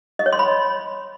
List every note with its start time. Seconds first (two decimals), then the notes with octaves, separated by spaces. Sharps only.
0.19 D#5
0.26 C#5
0.33 C6
0.39 B5